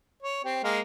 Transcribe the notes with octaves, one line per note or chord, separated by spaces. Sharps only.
C#5
C4 G4
G#3 A#3 F5